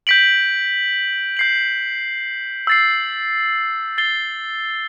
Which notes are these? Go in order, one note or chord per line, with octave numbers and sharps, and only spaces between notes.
G6 B6 D7 F#7
G6 C7 F#7
E6 A6 C7
A6 C7 G7